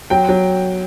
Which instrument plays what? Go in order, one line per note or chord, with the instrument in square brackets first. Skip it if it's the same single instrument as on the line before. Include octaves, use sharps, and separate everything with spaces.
[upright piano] F#3 G5
F#3